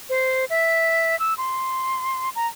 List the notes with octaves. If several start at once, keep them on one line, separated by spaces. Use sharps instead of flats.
C5
E5
E6
C6
A#5